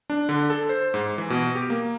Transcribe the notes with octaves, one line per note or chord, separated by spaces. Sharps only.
D4
D3
A4
C5
G#2
E3
B2
G4
A#3